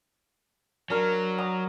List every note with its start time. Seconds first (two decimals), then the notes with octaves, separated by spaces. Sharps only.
0.90 F#3 D4 A#4 F5
1.38 F#5 A#5 D#6